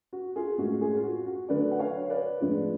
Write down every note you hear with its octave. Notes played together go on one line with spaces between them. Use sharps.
F#4
F4 G#4
A2 G#3 C#4 F#4
F4 G#4
F4
F#4
F#4
D3 F#3 A3 D4 B4 D5
F#5
C#5 F5
B4 D5
A2 F3 G#3 D4 F4